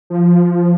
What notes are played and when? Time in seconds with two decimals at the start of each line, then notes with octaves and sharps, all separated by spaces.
0.10 F3